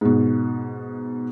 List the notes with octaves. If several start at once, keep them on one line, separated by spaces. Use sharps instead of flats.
G#2 B2